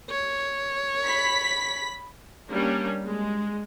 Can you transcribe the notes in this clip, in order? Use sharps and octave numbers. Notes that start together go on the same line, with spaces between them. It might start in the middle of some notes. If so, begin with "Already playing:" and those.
C#5
B5 B6
G3 A#3 C#4 D4
G#3